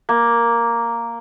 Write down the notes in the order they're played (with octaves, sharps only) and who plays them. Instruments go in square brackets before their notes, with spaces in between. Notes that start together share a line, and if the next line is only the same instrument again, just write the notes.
[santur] A#3